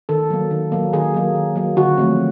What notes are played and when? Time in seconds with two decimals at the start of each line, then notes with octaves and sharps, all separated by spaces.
0.09 D#3 A4
0.30 F#3 A#3
0.51 D#3
0.72 F#3 A#3
0.93 D#3 G#4
1.14 F#3 A#3
1.35 D#3
1.56 F#3 A#3
1.76 D3 F#4
1.98 F3 A3 C4